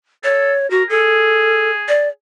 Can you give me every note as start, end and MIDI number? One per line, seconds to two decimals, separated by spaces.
0.24 0.53 69
0.24 0.69 73
0.70 0.83 66
0.70 0.84 70
0.90 2.12 68
0.90 1.70 69
1.88 2.08 74